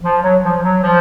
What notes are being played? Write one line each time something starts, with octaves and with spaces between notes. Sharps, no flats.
F3
F#3
F3
F#3
F3